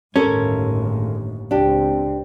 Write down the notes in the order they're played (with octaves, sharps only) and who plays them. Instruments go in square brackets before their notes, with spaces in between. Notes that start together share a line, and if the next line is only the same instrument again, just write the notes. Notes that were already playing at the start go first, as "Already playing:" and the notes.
[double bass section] G1 D#2 A2 [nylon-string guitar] G#3 A4 A#4 [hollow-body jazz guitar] C#4
[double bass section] C#2 C4 [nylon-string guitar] D4 G4